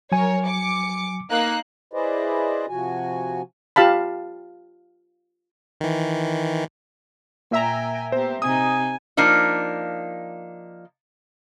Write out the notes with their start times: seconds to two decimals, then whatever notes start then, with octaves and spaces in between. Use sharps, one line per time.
0.12 F#3 A#4 C#5 G#5
0.46 D6 C#7
1.30 A#3 D#4 F#6
1.93 E4 G#4 B4 C5 D5 D#5
2.69 C3 F3 F#4 G#5
3.76 F4 G4 F5 A5 B5
5.81 D#3 E3
7.51 A#2 E5 G5 G#5 A#5
8.12 B3 G4 C5
8.42 C3 D#4 G#5 D#6
9.17 F3 A#3 D4 D#4